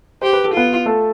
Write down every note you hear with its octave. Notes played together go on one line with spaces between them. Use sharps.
G4 C5
B4
A4
B3 F4 B4
A3 A4